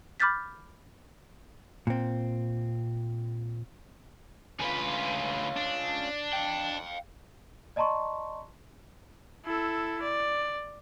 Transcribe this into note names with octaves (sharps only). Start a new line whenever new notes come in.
B5 D6 F6 G6 A6 B6
A#2 C4
D2 C#4 F4 B4
D4
F5 G5
D5 D#5 A5 A#5 C6 C#6
E4 A4
D5